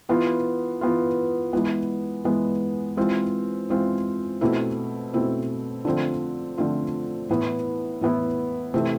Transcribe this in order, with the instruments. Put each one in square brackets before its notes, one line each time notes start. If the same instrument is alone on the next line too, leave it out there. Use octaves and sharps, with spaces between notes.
[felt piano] E3 B3 F4
E3 B3 F4
E3 G#3 B3
E3 G#3 B3
E3 G#3 C4 F4
E3 G#3 C4 F4
B2 A3 C4 E4
B2 A3 C4 E4
D3 F3 A3 C4 F4
D3 F3 A3 C4 F4
A2 E3 B3 E4
A2 E3 B3 E4
C3 E3 A3 C4